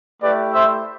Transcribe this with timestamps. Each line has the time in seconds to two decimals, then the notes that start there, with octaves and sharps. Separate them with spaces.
0.21 A3 E4 G4 B4 D5
0.53 C5 E5